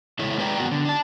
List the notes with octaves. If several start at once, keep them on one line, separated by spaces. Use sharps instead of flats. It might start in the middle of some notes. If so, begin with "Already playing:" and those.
E2 C#3 G#3 E4 A4 C#5
G#3 G#4 B4 D5 G5 A#5
G2 B3 F#4 A#4
D3
D4 A5